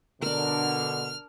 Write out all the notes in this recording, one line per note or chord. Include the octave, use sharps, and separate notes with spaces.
B2 D3 D4 A#4 F6